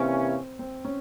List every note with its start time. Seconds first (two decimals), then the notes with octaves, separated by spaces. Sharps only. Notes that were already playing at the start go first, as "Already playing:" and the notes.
Already playing: C3 E3 A#3 C4 C#4
0.59 C4
0.85 C#4